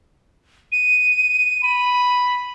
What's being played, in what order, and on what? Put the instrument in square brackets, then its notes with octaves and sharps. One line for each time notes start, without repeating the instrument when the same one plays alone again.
[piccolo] D#7
[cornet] B5